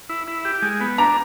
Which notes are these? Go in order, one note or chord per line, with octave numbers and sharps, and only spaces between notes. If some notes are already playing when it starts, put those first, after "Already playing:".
E4
E4
G4
G#3
B3
D4 A#5